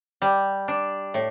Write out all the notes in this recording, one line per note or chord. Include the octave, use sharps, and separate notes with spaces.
G3
D4
A2